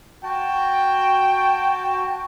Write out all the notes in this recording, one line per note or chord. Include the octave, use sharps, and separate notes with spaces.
F#4 G5 A5